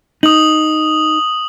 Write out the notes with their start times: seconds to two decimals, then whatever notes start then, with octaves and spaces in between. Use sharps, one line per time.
0.23 D#4 D#6 F#7